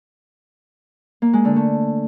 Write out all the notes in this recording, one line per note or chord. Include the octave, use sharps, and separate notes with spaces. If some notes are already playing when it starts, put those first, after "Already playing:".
A#3
G#3
D3
A3